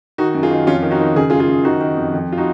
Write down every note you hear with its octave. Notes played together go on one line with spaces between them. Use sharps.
D#3 D#4 F#4
F#2
F4 G#4
D#3
F2 C#4 F4
D#3
D#4 F#4
D#3
C#3 G#4
F#2 F4 G#4
F4 G#4
F#2
D#3 D#4 F#4
D#3
F2
F2
F4
D#4 F#4